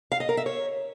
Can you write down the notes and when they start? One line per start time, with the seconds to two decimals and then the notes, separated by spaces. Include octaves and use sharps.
0.12 F5
0.20 D#5
0.29 A#4
0.37 E5
0.46 C#5